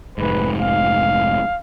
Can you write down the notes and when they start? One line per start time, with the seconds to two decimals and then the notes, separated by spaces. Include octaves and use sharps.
0.18 F1 G#2 B4
0.60 F5